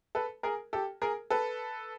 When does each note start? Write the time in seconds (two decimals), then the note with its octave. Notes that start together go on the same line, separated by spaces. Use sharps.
0.15 A4 B4
0.43 G#4 A#4
0.73 G4 A4
1.02 G#4 A#4
1.30 A4 B4